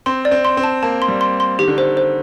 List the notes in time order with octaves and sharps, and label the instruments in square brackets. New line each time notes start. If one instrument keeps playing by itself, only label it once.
[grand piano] C4 [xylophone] C6
[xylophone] D5
[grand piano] C4
[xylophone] C6
[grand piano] C4
[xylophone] A5
[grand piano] A#3 [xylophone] A5
[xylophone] C6
[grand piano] G3
[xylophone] C6
C6
[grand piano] D#3 [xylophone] G4
[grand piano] D3
[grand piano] D#3 [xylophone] C5
[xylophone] C5